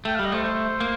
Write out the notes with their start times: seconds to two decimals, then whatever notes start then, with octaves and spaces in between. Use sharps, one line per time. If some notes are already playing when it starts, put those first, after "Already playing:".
0.05 A3 G5
0.15 G3 F5
0.25 D#5
0.32 A3 C5
0.43 C5
0.80 A#3